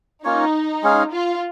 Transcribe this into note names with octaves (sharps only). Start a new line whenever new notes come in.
A#3 C#4 D#4 F4 C#5
G#3 C#4 G#4 F5
F4